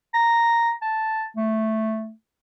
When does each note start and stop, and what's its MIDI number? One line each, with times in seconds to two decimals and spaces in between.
0.14 0.71 82
0.82 1.25 81
1.37 2.12 57